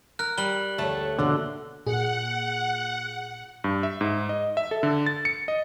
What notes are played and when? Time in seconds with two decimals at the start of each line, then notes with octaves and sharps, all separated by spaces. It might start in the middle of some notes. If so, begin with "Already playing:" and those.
0.19 A#4 F#6
0.38 G3 F#6 F#7 G7
0.78 D2 A3 A4 C#5 A5
1.19 G#2 B2 D3 A#3
1.86 A#2 G#4 F#5
3.64 G2
3.83 E5
4.01 G#2
4.29 D#5
4.57 E5
4.71 A4
4.83 D3
5.06 A6
5.25 C#7
5.48 D#5